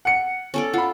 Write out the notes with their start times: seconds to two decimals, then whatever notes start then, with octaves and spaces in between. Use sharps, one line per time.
0.05 F#5 C#7
0.54 C#4 A4 D5
0.74 F4 F#5 B5